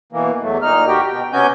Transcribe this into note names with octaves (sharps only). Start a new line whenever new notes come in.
B2 E3 A#3
E2 F#3 A3
A#2 D#4 F6
D2 F#4 G4 G5
B2 G5
C3 B3 C#4 F#4 G#5 G6